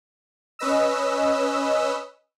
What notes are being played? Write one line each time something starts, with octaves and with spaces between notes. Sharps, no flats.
C#4 B4 D#5 E6